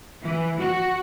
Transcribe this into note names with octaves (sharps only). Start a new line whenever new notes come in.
E3
F#4